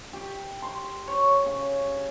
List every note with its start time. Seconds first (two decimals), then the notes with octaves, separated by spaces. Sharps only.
0.13 G4
0.62 C6
1.08 C#5
1.46 C#3